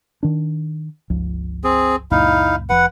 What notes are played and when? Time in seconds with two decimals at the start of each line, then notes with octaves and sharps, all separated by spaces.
0.23 D#3 D4
1.10 G1 C#2 F3
1.64 C4 G#4
2.11 C#2 F#2 A#2 D#4 E4 F5
2.69 F1 F3 B4 F#5